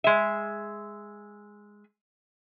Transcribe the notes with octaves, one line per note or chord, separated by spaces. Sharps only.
G#3 E5